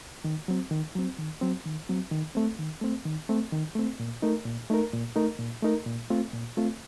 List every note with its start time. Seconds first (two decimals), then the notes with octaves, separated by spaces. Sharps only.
0.24 D#3
0.48 F#3 C4
0.71 D#3
0.95 F#3 C4
1.19 D#3
1.41 F#3 C4
1.66 D#3
1.89 F#3 C4
2.11 D#3
2.35 A3 C4
2.59 D#3
2.81 A3 C4
3.05 D#3
3.29 A3 C4
3.52 D#3
3.75 A3 C4
4.00 A#2
4.22 A3 D#4 A#4
4.45 A#2
4.70 A3 D#4 A#4
4.93 A#2
5.16 A3 D#4 A#4
5.39 A#2
5.62 A3 D#4 A#4
5.86 A#2
6.10 A3 C4 F4
6.33 A#2
6.57 A3 C4 F4